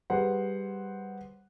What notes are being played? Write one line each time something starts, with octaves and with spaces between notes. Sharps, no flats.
G3 G#4 B4 C5 F#5